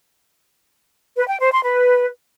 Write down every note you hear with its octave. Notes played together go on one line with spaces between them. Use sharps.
B4
G5
C5
C6
B4